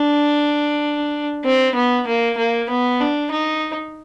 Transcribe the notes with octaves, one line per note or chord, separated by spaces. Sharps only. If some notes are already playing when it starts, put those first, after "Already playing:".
Already playing: D4
C4
B3
A#3
A#3
B3
D4
D#4